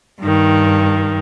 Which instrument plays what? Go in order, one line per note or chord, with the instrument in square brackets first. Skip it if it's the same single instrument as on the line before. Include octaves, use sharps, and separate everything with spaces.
[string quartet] G2 D#3